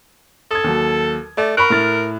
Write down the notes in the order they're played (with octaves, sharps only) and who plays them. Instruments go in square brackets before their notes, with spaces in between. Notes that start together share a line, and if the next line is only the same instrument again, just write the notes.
[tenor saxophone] A4 [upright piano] D#6 G#6
[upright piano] D#2 F#3
[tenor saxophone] A3 [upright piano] D5
[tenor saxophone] A#4 [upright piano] B5 C#6 F#6
[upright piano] A2 F6 A6